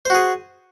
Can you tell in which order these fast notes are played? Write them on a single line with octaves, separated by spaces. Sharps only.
C5 F#4 G#4